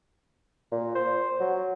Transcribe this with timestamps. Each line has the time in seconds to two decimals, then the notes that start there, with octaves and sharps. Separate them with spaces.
0.72 A#2
0.95 C5
1.40 F#3